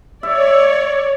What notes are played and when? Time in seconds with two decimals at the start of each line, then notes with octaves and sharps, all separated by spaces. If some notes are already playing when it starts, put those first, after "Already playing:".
0.23 C#5 D5 E5